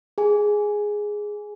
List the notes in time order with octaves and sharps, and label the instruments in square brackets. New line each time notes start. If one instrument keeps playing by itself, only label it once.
[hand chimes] G#4 G#5